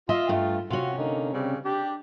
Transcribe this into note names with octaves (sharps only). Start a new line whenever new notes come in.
F4 D#5 E5
G2 A3
C3 C#4 F4 F#4
D3 A#3 D#4
C#3 G3 C4
D4 G4